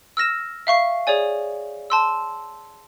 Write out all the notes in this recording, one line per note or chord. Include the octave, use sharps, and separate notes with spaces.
E6 F6 A#6 E7
E5 F5 C#6 C7
G#4 C#5 D5 G#5
A5 C6 E6